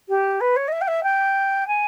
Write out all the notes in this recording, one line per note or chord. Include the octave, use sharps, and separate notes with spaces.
G4
B4
C#5
D#5
E5
G5
E5
G5
G#5